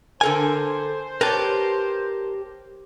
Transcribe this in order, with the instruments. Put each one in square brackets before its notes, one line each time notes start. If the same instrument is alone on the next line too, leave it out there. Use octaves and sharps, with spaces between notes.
[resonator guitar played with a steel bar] D3 A4 A#4 [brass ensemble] C5 [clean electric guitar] G#5
[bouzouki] G4 [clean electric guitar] A#4 A5 [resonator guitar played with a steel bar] B4 C#5